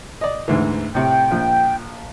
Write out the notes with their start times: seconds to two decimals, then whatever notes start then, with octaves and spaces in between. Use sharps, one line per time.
0.21 D5 D#5
0.48 D2 G#2 E3
0.95 A2 C3 G5
1.31 A#1 F3